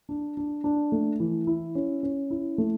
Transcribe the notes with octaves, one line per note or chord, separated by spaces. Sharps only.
D4
D4
D4
A3
E3
E4
C#4
C#4
E4
A3